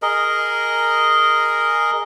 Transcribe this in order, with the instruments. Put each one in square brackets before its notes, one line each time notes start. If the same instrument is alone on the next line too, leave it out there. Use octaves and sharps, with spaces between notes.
[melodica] G#4 A#4 D#5